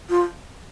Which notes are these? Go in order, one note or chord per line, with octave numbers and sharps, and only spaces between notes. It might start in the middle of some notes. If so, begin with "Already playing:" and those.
F4